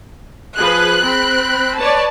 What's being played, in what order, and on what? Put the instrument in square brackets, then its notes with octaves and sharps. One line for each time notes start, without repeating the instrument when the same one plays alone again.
[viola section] F3 G#4 B4 [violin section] F#6
[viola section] C4 B5
[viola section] B4 C#5 D5 [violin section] A5